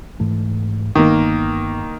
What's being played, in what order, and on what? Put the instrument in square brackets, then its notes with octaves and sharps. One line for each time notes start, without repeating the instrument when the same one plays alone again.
[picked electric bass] G#2 E3 A3
[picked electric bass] G1 B3 [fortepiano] D#3 A#3